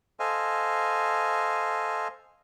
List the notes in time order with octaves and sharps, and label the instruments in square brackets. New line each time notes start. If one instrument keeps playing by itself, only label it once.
[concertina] A4 C5 D#5 F5 G#5